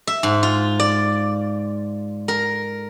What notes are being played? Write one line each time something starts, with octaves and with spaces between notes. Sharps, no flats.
E5
G#2
F4
D5
A#4